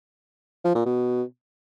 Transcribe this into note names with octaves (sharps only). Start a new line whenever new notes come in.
F3
A#2
B2